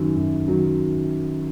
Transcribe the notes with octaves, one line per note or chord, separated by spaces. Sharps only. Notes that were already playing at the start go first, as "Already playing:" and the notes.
Already playing: F#2 D#3 F#3
F#2
D#3 F#3